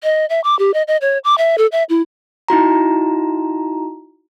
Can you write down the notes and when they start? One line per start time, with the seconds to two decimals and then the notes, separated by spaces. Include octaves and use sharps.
0.03 D#5
0.30 E5
0.44 D6
0.59 G4
0.74 D#5
0.88 D#5
1.01 C#5
1.24 D6
1.38 E5
1.58 A4
1.72 E5
1.89 E4
2.48 D#4 E4 F#4 A#5